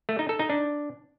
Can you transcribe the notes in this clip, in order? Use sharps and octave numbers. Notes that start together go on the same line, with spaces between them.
A3
D#4
A4
D#4
D4